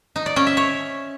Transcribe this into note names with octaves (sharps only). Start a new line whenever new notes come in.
D#4
D5
C#4
E5
C#5